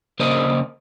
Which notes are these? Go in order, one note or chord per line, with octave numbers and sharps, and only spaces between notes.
C#3 A#3 A#4 C5 D5 D#5